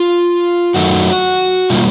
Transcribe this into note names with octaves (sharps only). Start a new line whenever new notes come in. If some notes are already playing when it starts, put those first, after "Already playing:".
Already playing: F4
F#2 D#3 F#3 A3 F#4
B2 G3 A#3 F4